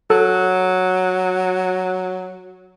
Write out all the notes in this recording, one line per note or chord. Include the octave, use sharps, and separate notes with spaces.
F#3 A4 F#6